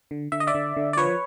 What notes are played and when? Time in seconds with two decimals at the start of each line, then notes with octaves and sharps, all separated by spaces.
0.11 D3
0.32 D3 E5
0.40 D#5
0.47 D5 E5
0.54 D3
0.76 D3
0.93 D5
0.97 F3 B4 C#5